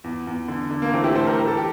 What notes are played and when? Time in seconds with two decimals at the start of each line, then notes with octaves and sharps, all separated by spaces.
0.04 E2
0.27 E2
0.48 D3
0.71 D3
0.82 A#3
0.93 E3 A3 C4
1.04 E4 G4
1.15 A2 A4 C5
1.27 G4 A#4
1.37 E3 A#4
1.47 A4
1.57 G4